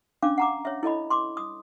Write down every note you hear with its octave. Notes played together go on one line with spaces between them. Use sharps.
C#4 D4 F5 D6
F#5 A#5 D6
C#5 E5
E4 A4 D#5 B5
C6 D6
D#6